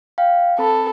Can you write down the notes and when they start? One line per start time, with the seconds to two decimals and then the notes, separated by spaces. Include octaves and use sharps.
0.18 F5 G5
0.59 C4 A4 B5